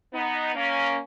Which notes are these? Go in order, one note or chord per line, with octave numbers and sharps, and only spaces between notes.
B3 D#4
A#3 C#4